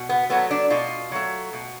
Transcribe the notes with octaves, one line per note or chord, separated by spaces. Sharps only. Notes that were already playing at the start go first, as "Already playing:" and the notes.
Already playing: B2
B3
F#3 A3 B3
D4
B2 F4
F#3 A3
B2